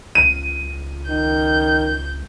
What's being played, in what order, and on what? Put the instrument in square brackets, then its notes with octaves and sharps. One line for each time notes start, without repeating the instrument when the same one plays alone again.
[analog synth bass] C#2 [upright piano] D#7
[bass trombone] D#3 [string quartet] G6